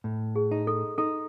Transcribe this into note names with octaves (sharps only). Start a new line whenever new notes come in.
A2
G#4
D#4
A4
D#4 A4